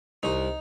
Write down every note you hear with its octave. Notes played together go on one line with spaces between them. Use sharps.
C2 D#4